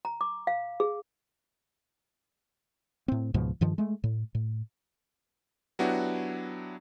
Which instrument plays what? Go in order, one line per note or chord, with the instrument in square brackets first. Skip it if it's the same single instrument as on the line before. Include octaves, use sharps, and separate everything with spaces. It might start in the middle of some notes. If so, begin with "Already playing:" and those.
[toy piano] A#5
D6
F5
G#4
[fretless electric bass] A2 C4
C#2 G#2 B2 F3
G2 D#3 F3
G#3 A3
A2
A2
[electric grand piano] F#3 B3 D4 E4 F#4 G4